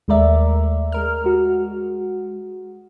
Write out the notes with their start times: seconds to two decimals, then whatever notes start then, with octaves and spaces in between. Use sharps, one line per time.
0.08 D#2 G#3 A3 A#4 D5 E5
0.92 G#3 A#4 F6
1.24 G#3 F#4